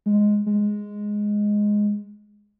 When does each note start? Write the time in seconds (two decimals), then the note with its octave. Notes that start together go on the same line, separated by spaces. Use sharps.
0.06 G#3
0.46 G#3